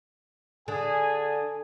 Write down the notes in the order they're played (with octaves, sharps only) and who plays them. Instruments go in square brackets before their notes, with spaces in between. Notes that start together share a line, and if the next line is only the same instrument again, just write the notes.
[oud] D3 [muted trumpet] G#4 [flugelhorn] G#5